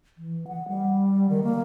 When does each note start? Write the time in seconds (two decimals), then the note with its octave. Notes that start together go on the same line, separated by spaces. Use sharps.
0.18 E3
0.47 F#5
0.68 G3
1.30 D#3
1.44 A#3